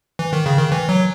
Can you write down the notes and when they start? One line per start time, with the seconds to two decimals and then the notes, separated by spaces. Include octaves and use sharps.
0.19 E3
0.33 D#3
0.46 C#3
0.58 D#3
0.72 E3
0.89 F#3